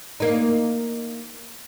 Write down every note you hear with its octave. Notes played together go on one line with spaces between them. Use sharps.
A#3 D#4